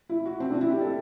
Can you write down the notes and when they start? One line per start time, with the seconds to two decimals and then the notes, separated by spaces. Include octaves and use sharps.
0.09 E4
0.25 F#4
0.40 C4
0.51 D4
0.61 E4
0.70 G4
0.81 A4